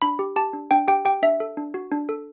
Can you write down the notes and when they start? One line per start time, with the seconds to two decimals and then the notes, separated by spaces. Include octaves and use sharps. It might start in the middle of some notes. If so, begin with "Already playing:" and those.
0.02 D4 B5
0.19 G4
0.36 G4 A5
0.53 D4
0.71 D4 G5
0.88 G4 G5
1.05 G4 G5
1.22 D4 E5
1.40 A4
1.57 D4
1.74 F#4
1.92 D4
2.09 A4